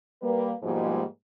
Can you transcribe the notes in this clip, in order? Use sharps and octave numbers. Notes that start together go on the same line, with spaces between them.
G3 A#3 B4
G#2 B2 F3 G3 G#3 A#3